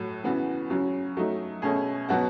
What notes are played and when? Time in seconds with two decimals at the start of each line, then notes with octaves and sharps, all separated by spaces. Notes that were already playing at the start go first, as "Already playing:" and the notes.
Already playing: A2 F#3
0.24 C#3 E3 B3 F#4
0.70 C#3 F#3 C#4
1.17 F#3 A3 D#4
1.62 B2 A3 C#4 G#4
2.09 B2 F#3 B3 F#4